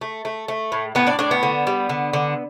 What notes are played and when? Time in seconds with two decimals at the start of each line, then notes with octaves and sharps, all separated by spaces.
0.01 A3
0.25 A3
0.48 A3
0.72 A2
0.95 A2 B3 B4
1.07 D4 D5
1.19 A2 D4 D5
1.31 B3
1.43 D3
1.67 G3
1.89 D3
2.13 D3